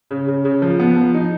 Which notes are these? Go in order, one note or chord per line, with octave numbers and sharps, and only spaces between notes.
C#3
C#3
C#3
F3
B3
F3
D#4